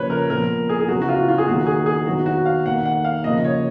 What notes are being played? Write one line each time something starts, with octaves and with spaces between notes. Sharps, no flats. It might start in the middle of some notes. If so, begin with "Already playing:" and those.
Already playing: C#3 F3 A#3 B4 C#5
A#4
A#2 F3 B3 A#4
G#4
G#4
C#3 F#3 B3 F#4
F#4
F4
F4
G#4
D#3 F#3 A#3 F#4
G#4
G#4
D#3 F#3 B3 F#4
F#4
F5
D#3 A#3 F#5
F#5
F5
C#3 F3 A#3 D#5
C#5